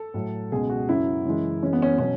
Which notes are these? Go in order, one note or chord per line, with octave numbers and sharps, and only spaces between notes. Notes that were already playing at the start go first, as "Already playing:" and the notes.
Already playing: A4
A2 F#3
C#2 B2 G#3 G#4
F#4
F#2 C#3 F#3 E4
F#2 C#3 E3 G#3
F#2 E3 G#3 C#4
B3
C#4
B2 F#3 C#4